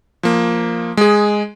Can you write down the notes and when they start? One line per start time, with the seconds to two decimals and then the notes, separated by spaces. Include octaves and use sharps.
0.23 F3 A#3
0.97 G#3 G#4